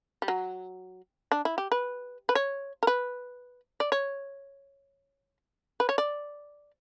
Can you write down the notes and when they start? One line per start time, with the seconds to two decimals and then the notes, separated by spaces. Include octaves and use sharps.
0.22 G3
0.28 F#3
1.31 D4
1.45 E4
1.58 G4
1.72 B4
2.29 B4
2.35 C#5
2.83 A#4
2.87 B4
3.80 D5
3.92 C#5
5.80 B4
5.89 C#5
5.98 D5